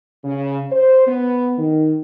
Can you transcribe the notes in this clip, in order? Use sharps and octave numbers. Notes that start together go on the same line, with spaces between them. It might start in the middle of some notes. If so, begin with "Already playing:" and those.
C#3
C5
B3
D#3